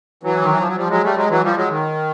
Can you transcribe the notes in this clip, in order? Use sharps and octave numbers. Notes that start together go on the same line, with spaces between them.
E3 F#3
D#3
E3
F3
F#3
F3 G3
F#3 G#3
G3 A3
F#3 G#3
E3 F#3
F3 G3
F#3 G#3
D#3